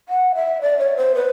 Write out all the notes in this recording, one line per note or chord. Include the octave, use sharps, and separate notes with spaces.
F#5
E5
D5
C#5
C5
B4